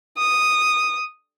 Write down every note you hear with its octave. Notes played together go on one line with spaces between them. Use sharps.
D#6